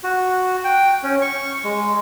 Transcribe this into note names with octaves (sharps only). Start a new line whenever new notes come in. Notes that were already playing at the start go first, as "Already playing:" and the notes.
F#4
G5
C#4
C#6
G#3